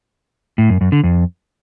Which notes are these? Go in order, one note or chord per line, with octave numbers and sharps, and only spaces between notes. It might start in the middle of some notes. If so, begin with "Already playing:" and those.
A2
F#2
F#2
D3
F2